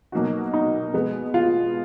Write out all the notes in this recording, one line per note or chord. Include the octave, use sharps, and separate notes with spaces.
B2 F#3 A#3 D#4 F#4
D#4
B2 G#3 B3
F4